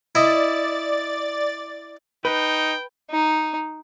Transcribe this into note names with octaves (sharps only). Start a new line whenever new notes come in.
E4 D5 D#5 A6
D#4 B4 G5
D#4